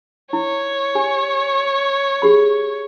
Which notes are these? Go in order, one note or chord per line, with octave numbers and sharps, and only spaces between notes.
E4 C#5
G4 G#5
G4 G#4 B5